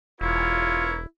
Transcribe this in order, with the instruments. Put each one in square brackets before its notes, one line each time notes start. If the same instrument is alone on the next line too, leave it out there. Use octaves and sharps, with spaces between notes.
[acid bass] E1 [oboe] E4 [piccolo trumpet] F4 [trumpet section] A#4 C#5